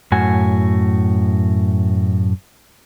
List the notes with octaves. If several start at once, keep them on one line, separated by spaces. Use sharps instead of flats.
F#2 A2 F#4 G#5